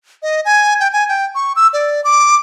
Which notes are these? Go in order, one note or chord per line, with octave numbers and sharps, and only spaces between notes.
D#5
G#5
G5
G#5
G5
C#6
E6
D5
D6